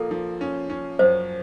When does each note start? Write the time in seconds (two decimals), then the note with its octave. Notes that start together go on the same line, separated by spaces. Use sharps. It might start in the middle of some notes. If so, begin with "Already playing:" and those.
Already playing: A#1 F3 A#3 A4
0.11 F3
0.41 C#4
0.70 C#4
0.99 F#2 C5